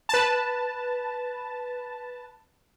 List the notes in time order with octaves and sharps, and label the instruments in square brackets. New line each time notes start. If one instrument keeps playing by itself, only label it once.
[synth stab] B4 A5